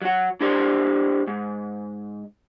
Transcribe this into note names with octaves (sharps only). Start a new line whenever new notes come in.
F#3 F#4
D4 E4 G4 A4 C5 C6
G#2